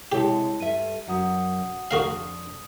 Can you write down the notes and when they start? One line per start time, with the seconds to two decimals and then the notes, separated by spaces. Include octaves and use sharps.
0.12 C3 G#3 E4 G4 C#5 A5
0.60 G2 A4 E5 D#7
1.08 F#2 F#4 F#5 D#6
1.91 F2 D4 F#4 A#4 F5 D#6